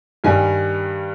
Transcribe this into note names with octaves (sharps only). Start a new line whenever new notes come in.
G2 D#3 G3 G#5